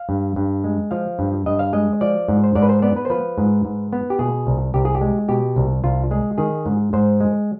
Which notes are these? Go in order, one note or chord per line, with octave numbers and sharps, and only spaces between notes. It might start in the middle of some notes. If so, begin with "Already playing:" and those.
Already playing: F5
G2
G2
G#3
F3 F5
G2
G2 D#5
F5
G#3 D#5
F3 D5
G#2
C5
G#2 D5
B4
C5
B3 D5
B4
C5
F3 B4
G#2
G#2
B3
G4
B2 G#4
C2
C2 G4
G#4
G4
G#3
B2 G4
C2
C2 F4
G#3 G#4
D#3 G#4
G#2
G#2 C5
G#3